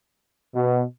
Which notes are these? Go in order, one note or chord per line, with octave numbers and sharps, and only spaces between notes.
B2